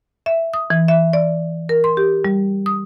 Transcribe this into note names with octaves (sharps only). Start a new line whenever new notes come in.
E5
D#6
E3
E5
D5
A#4
C6
G4
G3
D#6